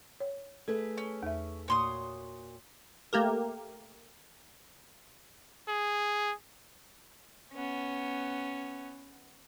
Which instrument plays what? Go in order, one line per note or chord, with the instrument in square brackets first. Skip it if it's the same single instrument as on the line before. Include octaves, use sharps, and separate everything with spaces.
[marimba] C#5
[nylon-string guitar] A3 G#4 B4 [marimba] A4
[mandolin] C#4
[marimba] E2 E5
[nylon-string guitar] A#2 F#4 [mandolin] C#5 C6 D#6
[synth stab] A3 A#3 G4 A#4
[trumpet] G#4
[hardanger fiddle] B3 C#4